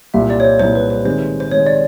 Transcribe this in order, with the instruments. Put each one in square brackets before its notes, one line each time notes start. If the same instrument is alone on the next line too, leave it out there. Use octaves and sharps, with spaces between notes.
[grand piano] C2 A#2 G3 [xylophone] E5
[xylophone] D5
C#5
C5
[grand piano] C2 A#2 G3 [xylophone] C5
[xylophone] B4
C5
[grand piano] C3 D#3 G#3 [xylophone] C5
[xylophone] C5
[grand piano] C3 D#3 G#3 [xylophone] C#5
[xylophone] D5